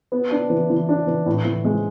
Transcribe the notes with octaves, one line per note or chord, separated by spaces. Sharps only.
B3
D4
E3
E3
D4
E3
A2
E3
G#3